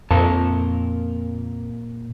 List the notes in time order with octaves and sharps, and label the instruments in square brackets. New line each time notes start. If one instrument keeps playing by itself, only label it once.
[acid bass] F2 [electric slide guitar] A#2 A#4 A5